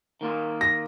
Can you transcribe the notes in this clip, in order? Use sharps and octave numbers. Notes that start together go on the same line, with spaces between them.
D#3 A#3 F4
A#6